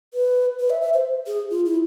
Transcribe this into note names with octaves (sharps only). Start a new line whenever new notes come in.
B4
B4
E5
E5
C5
G#4
F4
E4